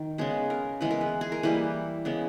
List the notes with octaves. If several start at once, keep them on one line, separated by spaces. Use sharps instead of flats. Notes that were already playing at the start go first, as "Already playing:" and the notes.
Already playing: D#3
C#3 G#3 B3 G#4
A#4
E3 G#3 B3 B4
A#4
B4
G#4
A#4
E3 G3 A#3 B4
C#3 G#3 B3